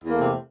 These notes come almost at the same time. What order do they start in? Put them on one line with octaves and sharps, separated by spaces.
E2 A#3 A3 C3